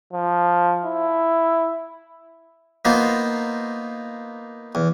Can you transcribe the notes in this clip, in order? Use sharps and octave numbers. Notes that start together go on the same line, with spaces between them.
F3
E4
A#3 B3 D#4 F4 C5
E2